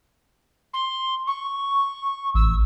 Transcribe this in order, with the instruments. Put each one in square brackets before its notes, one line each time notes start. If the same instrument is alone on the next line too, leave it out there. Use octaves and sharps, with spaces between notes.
[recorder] C6
C#6
[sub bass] A1 [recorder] E6